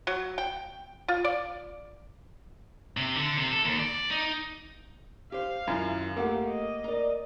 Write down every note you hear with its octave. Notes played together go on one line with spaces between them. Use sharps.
F#3
G5
F4
D5
C3
D3
C3
A4
D#2
D5
D#4
G4 C5 F5
F#2 D#3 E4 F4
A3 A#3 G4 A4 F5 F#5
D#5
A#4 D5